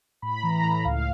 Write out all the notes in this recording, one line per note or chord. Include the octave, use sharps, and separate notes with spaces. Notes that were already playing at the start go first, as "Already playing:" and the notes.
A2 B5
E3 A#5
A2
C#2 F5